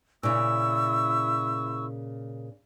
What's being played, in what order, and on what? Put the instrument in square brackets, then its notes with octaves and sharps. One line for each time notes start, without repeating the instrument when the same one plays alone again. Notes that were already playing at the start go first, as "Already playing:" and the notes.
[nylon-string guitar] A#2 C#3 [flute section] E4 C#6 E6